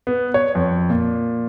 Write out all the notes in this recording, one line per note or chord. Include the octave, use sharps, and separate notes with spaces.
B3
C#5
F2
A#2